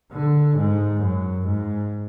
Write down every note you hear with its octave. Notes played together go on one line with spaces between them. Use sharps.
D3
G#2
F#2
G#2